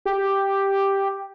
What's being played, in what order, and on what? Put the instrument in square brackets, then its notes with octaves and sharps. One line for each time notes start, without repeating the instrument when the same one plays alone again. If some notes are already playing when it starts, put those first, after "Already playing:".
[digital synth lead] G4